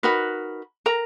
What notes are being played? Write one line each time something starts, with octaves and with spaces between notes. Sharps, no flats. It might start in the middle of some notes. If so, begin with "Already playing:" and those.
D#4 F#4 A#4 B4 B5
A#4 A#5